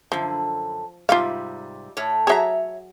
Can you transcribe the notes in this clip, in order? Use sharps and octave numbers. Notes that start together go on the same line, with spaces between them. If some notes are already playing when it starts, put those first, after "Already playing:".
F#2 D3 F3
G#2 C3 G3 F4 F5
A2 C#5
F#3 G#4 C#5 E5 A#5